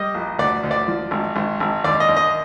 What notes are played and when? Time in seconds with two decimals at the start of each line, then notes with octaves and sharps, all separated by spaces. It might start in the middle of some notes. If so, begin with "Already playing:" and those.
Already playing: G3 D#5
0.14 A#1
0.39 D2 D5
0.63 D2
0.71 D5
0.88 F3
1.11 G#1
1.36 G#1
1.60 G#1
1.84 D#2 D5
2.00 D#5
2.09 D#2
2.16 D#5